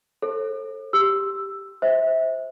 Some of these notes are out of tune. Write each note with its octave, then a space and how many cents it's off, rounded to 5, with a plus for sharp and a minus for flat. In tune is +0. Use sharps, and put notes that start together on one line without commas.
A4 +10 C5 +45
G4 +0 E6 +5
C5 +0 E5 -25